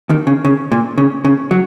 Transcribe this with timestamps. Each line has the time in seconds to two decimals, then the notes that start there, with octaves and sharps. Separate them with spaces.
0.09 D#2 D#3
0.27 C#3
0.45 C#3
0.72 A#2
0.98 C#3
1.25 C#3
1.51 F#3